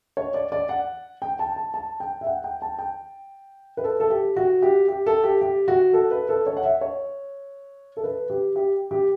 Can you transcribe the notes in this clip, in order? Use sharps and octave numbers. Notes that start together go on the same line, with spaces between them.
C#5
D5
D5
F#5
G5
A5
A5
A5
G5
E5
F#5
G5
A5
G5
B4
A4
A4
G4
F#4
G4
G4
A4
G4
G4
F#4
A4
B4
A4
C#5
F#5
E5
C#5
A4
B4
G4
G4
G4